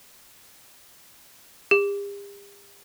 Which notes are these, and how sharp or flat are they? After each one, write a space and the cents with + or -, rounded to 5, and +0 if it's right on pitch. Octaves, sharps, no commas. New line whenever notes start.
G4 +45